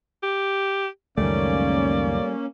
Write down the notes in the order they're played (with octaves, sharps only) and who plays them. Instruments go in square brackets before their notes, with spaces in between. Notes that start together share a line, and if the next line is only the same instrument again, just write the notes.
[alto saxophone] G4
[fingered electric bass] C#2 F#2 D#3 [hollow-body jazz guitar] G3 A3 [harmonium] A#3 C#4 [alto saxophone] D5